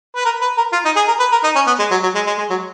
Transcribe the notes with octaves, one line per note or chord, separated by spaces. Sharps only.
B4
A#4
B4
A#4
F4
D#4
G#4
A#4
B4
A#4
D#4
C#4
B3
G#3
F#3
F#3
G#3
G#3
G#3
F#3